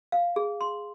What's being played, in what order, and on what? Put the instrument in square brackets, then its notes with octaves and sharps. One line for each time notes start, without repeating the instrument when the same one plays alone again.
[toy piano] F5
G#4
C6